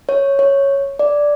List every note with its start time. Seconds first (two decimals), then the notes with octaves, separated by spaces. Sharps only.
0.09 C#5
0.39 C#5
0.99 D5